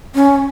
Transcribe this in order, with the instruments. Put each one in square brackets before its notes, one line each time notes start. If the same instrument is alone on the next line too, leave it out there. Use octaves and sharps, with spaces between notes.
[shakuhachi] C#4